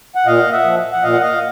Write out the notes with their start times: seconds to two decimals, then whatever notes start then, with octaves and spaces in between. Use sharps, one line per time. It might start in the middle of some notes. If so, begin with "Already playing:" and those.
0.15 F#5
0.26 A#2 D#5 F5
0.52 E5 F#5
0.65 F3
0.92 F#5
1.03 A#2 D#5 F5
1.13 F#5
1.22 D#5 F5